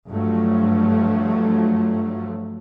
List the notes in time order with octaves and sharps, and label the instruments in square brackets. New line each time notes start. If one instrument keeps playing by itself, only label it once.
[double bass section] G2 F3 F#3 A3